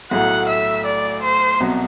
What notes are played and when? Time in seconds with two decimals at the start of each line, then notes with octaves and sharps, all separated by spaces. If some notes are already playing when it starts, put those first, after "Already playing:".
0.11 B1 A2 F#3 A3 F#5
0.49 E5
0.85 D5
1.23 C5
1.60 C2 B2 F#3